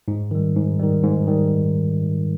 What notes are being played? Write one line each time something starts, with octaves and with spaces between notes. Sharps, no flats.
G#2
D#3 G3
G#2
D#3 G3
G#2
D#3 G3